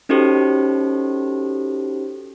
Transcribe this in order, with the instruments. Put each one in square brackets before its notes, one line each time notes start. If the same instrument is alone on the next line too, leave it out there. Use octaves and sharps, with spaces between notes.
[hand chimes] C#4 D#4 F#4 G4 A4 C5